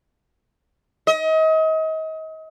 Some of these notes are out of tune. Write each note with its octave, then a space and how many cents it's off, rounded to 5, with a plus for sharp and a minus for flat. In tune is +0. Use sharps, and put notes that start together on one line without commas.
D#5 +35